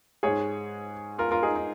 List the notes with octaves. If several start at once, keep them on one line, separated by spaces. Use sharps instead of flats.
G#2 G#3 G#4 C#5
F4 A#4
F4 A#4
D#4 G#4
D#4